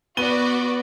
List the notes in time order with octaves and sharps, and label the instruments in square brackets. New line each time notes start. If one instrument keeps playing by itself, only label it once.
[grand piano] B3 D#7 G7 [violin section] F#4 B4 D5